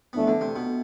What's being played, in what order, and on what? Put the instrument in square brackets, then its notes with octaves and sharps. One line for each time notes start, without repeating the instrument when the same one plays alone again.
[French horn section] F2 E3 A3 D4 [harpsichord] B3
[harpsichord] D3
C3
B2